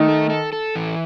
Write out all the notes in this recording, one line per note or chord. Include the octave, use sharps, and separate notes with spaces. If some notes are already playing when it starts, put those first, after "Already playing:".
Already playing: D#3 A3 D#4
A4
A4
A4
E3